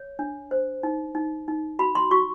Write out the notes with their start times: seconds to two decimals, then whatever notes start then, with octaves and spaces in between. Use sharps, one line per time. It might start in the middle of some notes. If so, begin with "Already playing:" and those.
Already playing: C#5
0.19 D4
0.51 C5
0.83 D#4
1.15 D#4
1.48 D#4
1.79 F#4 B5
1.95 C6
2.11 F#4 C#6